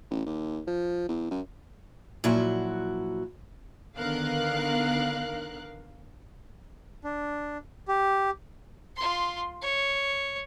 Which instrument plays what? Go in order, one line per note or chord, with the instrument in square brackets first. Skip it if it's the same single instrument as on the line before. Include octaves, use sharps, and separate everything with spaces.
[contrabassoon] A1
D#2
F3
E2
F#2
[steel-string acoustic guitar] A#2 F3 F#3 E4 F#4
[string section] D3 D#3 B3 A#4 F5 F#6
[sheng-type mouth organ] D4
G4
[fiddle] F4 C6
C#5